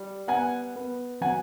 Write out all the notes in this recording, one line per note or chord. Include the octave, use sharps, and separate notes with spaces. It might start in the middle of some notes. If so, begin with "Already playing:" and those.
Already playing: G3
B3 F#5 G#5
B3
F#3 F#5 G#5